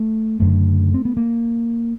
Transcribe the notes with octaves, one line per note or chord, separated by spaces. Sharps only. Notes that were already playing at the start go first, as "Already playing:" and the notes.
Already playing: A3
F#1 F#2 D3 A3
C4
B3
A#3